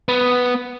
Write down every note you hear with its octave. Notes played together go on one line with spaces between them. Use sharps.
B3